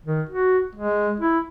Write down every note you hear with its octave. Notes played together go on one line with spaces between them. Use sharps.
D#3
F#4
G#3
E4